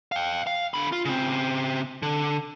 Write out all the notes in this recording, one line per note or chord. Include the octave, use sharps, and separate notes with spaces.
F5 G5
F5
D3 B5
F4
C#3 C4
D3